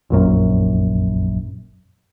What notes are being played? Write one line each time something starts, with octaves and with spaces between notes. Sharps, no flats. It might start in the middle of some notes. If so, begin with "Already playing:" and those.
F1 A#1 F#2